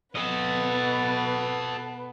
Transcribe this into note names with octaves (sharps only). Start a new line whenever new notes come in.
B2 B3 A4 B4 D#5